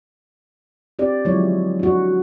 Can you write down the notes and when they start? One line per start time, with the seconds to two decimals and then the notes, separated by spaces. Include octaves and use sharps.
0.99 C4 G4 D5
1.25 D3 F3 F#3 G#3 E4 C#5
1.79 D4 F#4